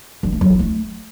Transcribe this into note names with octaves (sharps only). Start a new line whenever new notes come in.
G3
A3
F#3
E4
A3